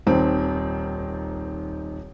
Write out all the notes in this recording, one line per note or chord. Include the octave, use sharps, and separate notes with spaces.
D#1 D#3 C4